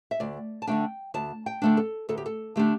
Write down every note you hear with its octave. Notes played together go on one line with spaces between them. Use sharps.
E5
D2 D5
A5
D3 A3 D4 G5
D2 A5
G5
D3 A3 D4
A4
D2 A4
G4
A4
D3 A3 D4 G4